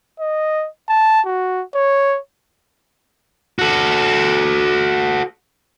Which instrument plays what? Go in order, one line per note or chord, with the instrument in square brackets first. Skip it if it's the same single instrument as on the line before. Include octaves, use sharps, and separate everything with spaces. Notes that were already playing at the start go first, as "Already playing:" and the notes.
[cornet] D#5
A5
F#4
C#5
[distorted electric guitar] F#4 A4